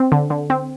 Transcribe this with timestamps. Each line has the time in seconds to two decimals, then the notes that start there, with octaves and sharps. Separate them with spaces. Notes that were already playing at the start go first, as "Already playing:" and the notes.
Already playing: C4
0.12 D3
0.30 D3
0.50 C4